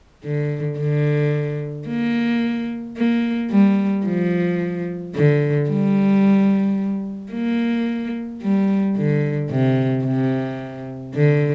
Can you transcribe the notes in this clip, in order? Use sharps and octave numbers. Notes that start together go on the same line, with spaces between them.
D3
D3
A#3
A#3
G3
F3
D3
G3
A#3
G3
D3
C3
C3
D3